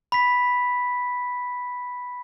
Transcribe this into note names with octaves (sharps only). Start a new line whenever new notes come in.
B5 B6